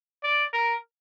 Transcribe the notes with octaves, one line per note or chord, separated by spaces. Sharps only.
D5
A#4